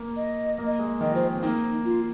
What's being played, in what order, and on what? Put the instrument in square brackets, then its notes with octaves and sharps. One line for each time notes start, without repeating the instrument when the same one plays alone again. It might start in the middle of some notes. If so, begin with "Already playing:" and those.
Already playing: [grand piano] A#3
[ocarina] D#5
[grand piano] A#3
G#3
[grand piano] D#3 [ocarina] D#5
[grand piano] F3 [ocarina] C5
[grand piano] C4
[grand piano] A#3 [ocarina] D#4
[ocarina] F4